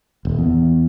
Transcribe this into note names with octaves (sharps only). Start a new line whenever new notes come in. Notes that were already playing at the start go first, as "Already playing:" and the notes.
D#1
E2